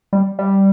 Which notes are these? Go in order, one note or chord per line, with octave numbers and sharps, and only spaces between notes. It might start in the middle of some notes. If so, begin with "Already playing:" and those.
G3
G3